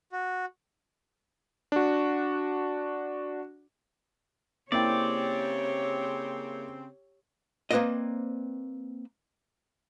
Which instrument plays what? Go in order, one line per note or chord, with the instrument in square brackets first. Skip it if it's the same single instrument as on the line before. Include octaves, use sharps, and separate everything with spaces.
[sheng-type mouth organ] F#4
[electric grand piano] D4 F#4
[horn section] C#3 C4 [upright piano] A#3 E4 G5 [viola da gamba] G4 C#5 [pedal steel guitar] D5
[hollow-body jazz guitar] A#3 C4 B4 C5 D5 D#5